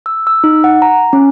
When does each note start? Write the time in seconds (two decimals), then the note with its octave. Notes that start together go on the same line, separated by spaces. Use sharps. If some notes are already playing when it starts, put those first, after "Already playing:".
0.06 E6
0.27 E6
0.44 D#4
0.64 F#5
0.82 A#5
1.13 C#4